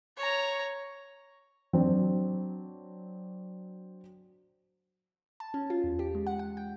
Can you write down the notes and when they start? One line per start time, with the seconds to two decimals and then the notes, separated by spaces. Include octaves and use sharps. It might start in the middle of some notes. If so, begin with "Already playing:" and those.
0.17 C#5 A#5
1.73 F#3 C4 D4
5.40 A5
5.54 C#4
5.70 F4
5.84 E2
5.99 G4
6.15 G#3
6.27 F#5
6.39 F#5
6.57 G5